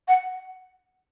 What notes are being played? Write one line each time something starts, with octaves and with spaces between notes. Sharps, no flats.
F#5